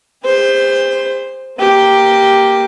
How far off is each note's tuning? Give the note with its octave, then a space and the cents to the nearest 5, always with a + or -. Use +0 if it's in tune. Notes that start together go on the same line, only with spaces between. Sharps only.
G4 +45 C5 +0
A#3 +0 G4 +0